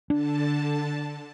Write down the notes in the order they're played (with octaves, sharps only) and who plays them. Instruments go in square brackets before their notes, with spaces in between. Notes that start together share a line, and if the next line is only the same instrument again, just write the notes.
[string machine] D3 A5 [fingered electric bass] D4